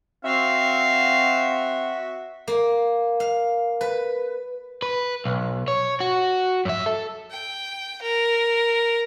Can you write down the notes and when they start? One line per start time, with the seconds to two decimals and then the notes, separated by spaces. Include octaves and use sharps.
0.25 C4 F#4 E5 F5
2.48 A#3
3.20 F5
3.81 B4
4.82 B4
5.25 B1
5.68 C#5
6.00 F#4
6.65 F#2 E5
6.86 A4
7.31 G5
8.02 A#4